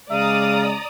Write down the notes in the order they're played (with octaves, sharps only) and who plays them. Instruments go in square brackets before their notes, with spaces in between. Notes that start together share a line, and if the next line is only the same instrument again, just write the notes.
[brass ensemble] C#3 G#3 [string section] D5 A#5 D#6 [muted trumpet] F5